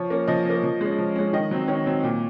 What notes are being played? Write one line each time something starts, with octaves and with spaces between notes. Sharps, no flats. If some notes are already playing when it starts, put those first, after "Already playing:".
Already playing: F3 C#5
A#3 C#4
F3 D#5
A#3 C#4
F3
G#3 C#4
F3
G#3 C#4
D#3 D#5
F#3 C4
D#3 C#5
F#3 C4
A#2